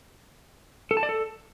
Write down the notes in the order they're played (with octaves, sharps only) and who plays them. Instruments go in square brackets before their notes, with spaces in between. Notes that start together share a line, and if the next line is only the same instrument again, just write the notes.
[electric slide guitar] A4
A5
D5
A4